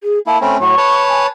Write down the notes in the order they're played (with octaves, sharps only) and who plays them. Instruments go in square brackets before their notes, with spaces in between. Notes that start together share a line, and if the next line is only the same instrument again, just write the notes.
[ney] G#4
[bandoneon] A#3 E4 [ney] A5
[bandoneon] A3 C4 C#4 [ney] B5
[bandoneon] A2 F#3 [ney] C#6
[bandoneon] B4 C#5 A5
[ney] G#5